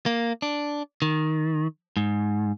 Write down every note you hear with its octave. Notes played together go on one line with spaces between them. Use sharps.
A#3
D4
D#3
G#2